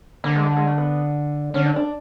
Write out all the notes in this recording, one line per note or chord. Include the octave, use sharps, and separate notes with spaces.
D3 A#3
G#3
G3
G#3
A3
B3
D3 C#4
D4
D4